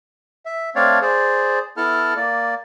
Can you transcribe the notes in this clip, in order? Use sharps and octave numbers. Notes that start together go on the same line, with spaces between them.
E5
A3 C4 D4 C#5 D5 F5
G#4 C5 D5
B3 E4 A4 A5 F6
A#3 D5